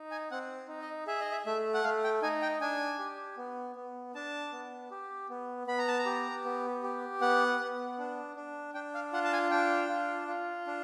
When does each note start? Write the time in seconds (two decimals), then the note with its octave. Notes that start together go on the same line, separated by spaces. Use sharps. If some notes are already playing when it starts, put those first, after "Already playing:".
Already playing: D#4
0.11 G#5
0.31 C4 F#5
0.68 D#4
0.81 D#5
1.07 G#4 E5
1.20 D#5
1.32 E5
1.46 A3 E5
1.74 F#5
1.84 A3 F5
2.04 G5
2.22 D#4 G#5
2.42 G5
2.61 D4 G#5
2.99 G4
3.37 B3
3.76 B3
4.15 D4 A5
4.52 B3
4.91 G4
5.30 B3
5.67 B3 B5
5.79 A#5
5.88 A5
5.99 A#5
6.06 G4
6.45 B3
6.83 G4
7.21 B3 F#5
7.60 B3
7.98 D4
8.36 D4
8.74 D4 G5
8.94 F5
9.13 F4 F#5
9.24 A5
9.33 G#5
9.51 D4 G5
9.89 F4
10.28 F4
10.67 D4